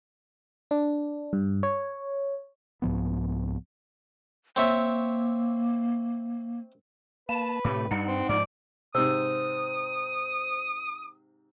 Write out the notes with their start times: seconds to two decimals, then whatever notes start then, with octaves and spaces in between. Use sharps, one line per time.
0.71 D4
1.33 G2
1.63 C#5
2.82 C2 G#2 F3 B3
4.56 A#3 C4 C#5 E5
7.29 A#3 B4 A5
7.65 A2 C3 A3 G4
7.91 G2 G3 D#4 F#5
8.07 C4
8.29 G#2 F3 D5
8.95 G#2 C3 C5 D#6 E6